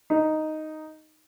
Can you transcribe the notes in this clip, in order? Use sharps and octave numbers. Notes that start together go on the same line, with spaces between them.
D#4